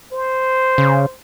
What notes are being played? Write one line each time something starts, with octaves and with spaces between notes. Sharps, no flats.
C5
C#3